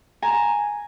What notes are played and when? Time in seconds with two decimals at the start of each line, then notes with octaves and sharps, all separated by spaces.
0.22 G#5 A#5